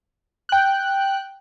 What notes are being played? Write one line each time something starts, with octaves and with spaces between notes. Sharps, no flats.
G5 F#6